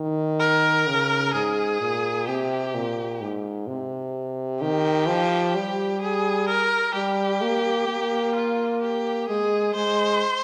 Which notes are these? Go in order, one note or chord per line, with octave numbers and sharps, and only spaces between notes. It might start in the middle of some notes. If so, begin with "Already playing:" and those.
Already playing: D#3
A#4
C#3
G#2 G#4
A#2
C3 G4
A#2
G#2
C3
D#3 G4
F3
G3
G#4
A#4
G3 G4
A#3
A#3
F4
G4
G#3 G#4
G#3 C5